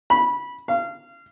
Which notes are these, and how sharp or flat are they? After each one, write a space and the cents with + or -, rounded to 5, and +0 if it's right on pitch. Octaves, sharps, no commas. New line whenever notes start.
B5 -15
F5 -25